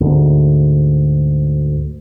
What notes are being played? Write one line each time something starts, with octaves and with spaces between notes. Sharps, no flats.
D2 G#2